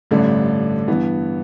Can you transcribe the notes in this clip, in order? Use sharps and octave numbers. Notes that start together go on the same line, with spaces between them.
A1 G2 D3 A3 D4
G2 E3 B3